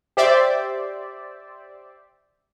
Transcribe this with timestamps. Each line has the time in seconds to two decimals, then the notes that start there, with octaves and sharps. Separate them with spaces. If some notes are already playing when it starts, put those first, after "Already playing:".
0.17 G4 C5 D5 E5